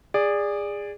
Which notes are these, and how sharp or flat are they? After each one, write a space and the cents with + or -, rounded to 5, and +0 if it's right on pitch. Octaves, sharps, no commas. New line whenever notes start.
G#4 -20 D5 +0